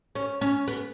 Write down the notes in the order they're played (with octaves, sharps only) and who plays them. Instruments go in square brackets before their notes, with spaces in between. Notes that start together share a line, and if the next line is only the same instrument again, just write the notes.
[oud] C#4
C#4
B3